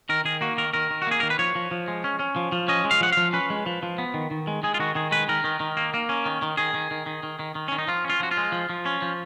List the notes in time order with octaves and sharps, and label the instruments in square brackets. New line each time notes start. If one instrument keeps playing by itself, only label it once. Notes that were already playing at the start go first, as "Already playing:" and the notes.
[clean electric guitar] D#3 A#4
D#3 G#4
A#3 F#4
D#3 A#4
D#3 A#4
D#3
F#4
A#3 G#4
D#3 A#4
B4
F3 C#5
F3
F3
G#3
C#4
C#4
F3
F3
C#4 D#5
G#3
F5
F3 F#5
F3 F5
C#4 B4
G#3
F3
F3
B3
D#3
D#3
G#3
G#3 G#4
F4
D#3 F#4
D#3 G#4
G#3 B4
D#3 A#4
D#3
D#3
A#3
A#3
C#4
D#3
D#3
D#3 G#4
D#3
D#3
D#3
D#3
D#3
D#3
D#3 C#4
D#4
F3 F4
C#4
F4
F3 F#4
F4
G#3
F3
F3
C#4
F3